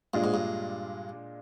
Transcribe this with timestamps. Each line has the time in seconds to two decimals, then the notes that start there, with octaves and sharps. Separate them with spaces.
0.13 G2 A#2 G#3 D4 F4
0.24 G#2
0.34 G2